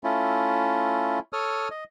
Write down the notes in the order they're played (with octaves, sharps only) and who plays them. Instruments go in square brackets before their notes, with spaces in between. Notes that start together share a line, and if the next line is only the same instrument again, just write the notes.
[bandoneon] A3 C#4 E4 F4
A4 C#5 D#6 F6
D#5